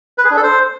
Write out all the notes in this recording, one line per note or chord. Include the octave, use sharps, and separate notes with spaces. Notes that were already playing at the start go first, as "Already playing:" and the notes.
B4
G#4
D4
A4
C5